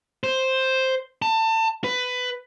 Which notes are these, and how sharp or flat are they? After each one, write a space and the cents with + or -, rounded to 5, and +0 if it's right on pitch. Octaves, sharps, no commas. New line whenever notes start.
C5 +5
A5 +25
B4 +15